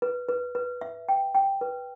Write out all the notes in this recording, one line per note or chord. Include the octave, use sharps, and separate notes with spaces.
B4
B4
B4
E5
G5
G5
B4